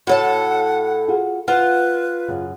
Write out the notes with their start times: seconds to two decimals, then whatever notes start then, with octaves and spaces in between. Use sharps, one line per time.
0.07 A2 F#4 A4 C#5 F#5 A5
1.08 F4 F#4 G#4
1.48 F4 B4 C5 F#5
2.28 F#2 C#3